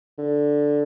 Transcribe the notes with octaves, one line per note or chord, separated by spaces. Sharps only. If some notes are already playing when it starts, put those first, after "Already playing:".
D3